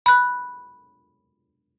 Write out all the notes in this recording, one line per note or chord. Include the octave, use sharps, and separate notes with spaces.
B5 F#6